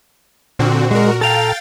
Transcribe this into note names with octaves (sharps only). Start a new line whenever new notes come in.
A#2 D3 C4 F#4
G#3 F#4 A#4
A4 F5 G5 A#5 A6